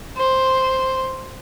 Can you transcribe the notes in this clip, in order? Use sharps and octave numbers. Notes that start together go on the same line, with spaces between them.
C5